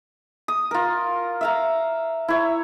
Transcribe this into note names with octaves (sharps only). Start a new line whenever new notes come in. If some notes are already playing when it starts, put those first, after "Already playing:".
D#6
F4 A#4
E5 F5 A#5
E4 C#5